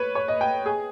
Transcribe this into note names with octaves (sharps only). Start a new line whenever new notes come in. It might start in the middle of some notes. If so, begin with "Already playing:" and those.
Already playing: B4 C#5
C#5
D#5
G5
G#4